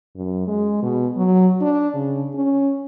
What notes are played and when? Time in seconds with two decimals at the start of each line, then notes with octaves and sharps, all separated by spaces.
0.16 F#2
0.47 G#3
0.82 B2
1.16 F#3
1.61 D4
1.94 C#3
2.34 C#4